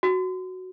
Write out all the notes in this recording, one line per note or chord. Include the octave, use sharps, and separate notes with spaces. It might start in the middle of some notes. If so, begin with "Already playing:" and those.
F#4